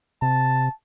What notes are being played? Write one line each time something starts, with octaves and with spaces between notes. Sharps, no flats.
C3 A5